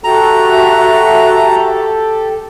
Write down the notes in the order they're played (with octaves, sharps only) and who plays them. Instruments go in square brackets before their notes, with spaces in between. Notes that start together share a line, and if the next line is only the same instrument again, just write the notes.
[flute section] F#4 E5 [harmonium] G4 A4 [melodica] A#5